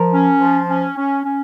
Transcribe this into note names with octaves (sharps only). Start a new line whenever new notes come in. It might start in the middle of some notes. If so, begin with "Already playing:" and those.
Already playing: F3 A#4
C#4
F3
C#4
C#4
C#4